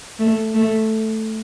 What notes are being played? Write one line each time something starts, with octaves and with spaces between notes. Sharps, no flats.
A3
A3